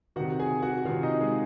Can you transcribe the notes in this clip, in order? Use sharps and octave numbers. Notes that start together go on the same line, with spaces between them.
C3 D#3 F#4 F#5
G#4 G#5
F#4 F#5
C3 D#3 F4 F5
D#4 D#5
G#3 G#4